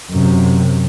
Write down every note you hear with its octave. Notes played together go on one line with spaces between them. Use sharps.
F#2 C3